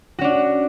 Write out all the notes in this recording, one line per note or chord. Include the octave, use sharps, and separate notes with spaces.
C#4 D4 F#4